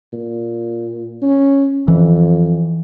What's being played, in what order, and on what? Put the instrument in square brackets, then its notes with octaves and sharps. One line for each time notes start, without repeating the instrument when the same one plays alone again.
[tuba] A#2
C#4
[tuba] F2 [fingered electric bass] E3